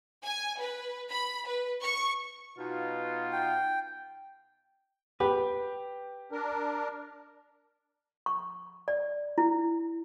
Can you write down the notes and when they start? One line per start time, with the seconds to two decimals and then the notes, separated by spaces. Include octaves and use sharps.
0.25 G#5
0.60 B4
1.11 B5
1.46 B4
1.81 C#6
2.58 B2 D#4 F4
3.32 G5
5.20 G4 B4 G5
6.32 D4 A#4
8.26 C#6
8.88 D5
9.38 E4